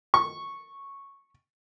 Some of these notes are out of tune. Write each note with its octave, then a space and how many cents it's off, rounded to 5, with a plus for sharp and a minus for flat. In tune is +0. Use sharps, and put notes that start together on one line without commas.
C#6 -5